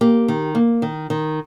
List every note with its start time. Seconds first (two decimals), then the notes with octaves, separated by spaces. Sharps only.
0.01 A#3 G4
0.28 D#3
0.55 A#3
0.82 D#3
1.10 D#3